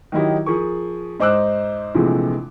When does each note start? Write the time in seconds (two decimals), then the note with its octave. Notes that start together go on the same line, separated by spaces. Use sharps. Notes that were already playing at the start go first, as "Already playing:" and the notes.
0.12 D#3 F#3 D#4 E4 G4
0.46 F3 G#4 A#4 C#6
1.20 G#2 D#4 C5 D6 E6 F#6
1.94 A#1 C3 E3 F3 G#3 A3